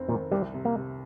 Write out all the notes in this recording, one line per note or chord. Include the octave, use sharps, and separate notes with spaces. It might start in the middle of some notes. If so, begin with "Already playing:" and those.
Already playing: F1 C4
A#2 D#3
C2 G3
C3
A#3
C3